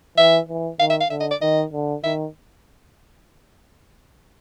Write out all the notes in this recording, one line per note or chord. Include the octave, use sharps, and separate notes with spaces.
E3 E5
E3
D#3 F5
E5
F5
D3 E5
D#5
D5
D#3 D#5
D3
D#3 E5